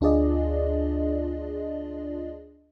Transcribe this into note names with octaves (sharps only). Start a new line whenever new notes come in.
D2 D4 F4 G#4 D5 D#5